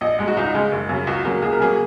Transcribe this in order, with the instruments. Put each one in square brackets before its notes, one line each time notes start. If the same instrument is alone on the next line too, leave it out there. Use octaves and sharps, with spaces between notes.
[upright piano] A#1 D#5
G#2 G#3
F#4
C#2 D#4
C#3 G#3
F#1
F#2 C#3 F#3
C#2 F#4
C#3 F#3 A#3
C#2 G#4
A#4
C#3 F#3 A#3 G#4